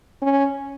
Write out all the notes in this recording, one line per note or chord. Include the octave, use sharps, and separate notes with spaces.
C#4